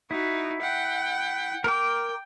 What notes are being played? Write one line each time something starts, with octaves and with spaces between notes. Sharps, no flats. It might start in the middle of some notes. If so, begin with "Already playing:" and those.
D#4 E4 F#4
F#5 G5
A#4 G5 D6